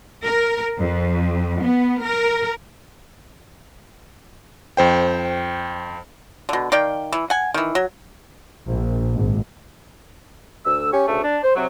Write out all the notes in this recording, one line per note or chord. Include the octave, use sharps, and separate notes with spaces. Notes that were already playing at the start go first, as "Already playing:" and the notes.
A#4
F2
B3
A#4
F2 C5 G5
B2 D3
D#3 D5 F5 G5
E3
F#5 G#5
D#3 E3
F#3
A#1
G#1
D2 E6
C#4 G4 C#5
D2 C#3 A3
D4
C5
C3 F#3